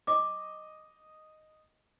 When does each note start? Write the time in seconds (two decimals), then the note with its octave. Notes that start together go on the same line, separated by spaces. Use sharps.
0.07 D#5 D6